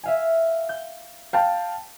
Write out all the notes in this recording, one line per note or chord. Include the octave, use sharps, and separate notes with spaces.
E5 F5 G#5
G6
F5 G5 A5 G6